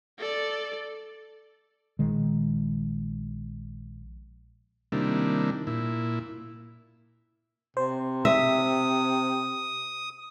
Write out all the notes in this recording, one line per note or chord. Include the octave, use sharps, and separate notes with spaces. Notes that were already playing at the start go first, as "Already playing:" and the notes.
A4 D5
A#1 D#3 G#3
C3 D#3 G3 A#3 D4 E4
A#2 E4
C3 C5
E5 D#6